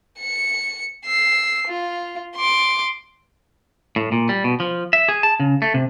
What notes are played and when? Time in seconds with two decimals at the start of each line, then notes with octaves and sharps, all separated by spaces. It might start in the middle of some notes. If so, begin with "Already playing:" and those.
0.19 C#7
1.05 E6 C7
1.68 F4
2.36 C6 D6
3.96 A2
4.12 A#2
4.29 G3
4.44 B2
4.60 F3
4.93 E5
5.09 G#4
5.23 A5
5.40 C#3
5.62 A3
5.74 C3